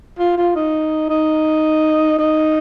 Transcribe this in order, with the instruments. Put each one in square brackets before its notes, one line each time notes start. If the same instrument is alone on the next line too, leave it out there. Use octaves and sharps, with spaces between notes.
[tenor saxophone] F4
F4
D#4
D#4
D#4